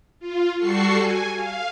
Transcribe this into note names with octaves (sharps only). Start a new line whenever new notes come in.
F4
G3 F#4 A4 C#6 C7
G#5
F5